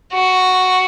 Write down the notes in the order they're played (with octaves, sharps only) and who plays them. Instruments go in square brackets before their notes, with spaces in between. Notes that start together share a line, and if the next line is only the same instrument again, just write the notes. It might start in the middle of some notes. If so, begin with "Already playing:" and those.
[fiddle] F#4